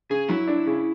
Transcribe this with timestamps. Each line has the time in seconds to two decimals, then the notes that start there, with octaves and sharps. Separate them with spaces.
0.10 C#3 G#4
0.29 F#3 E4
0.48 D4
0.66 C#3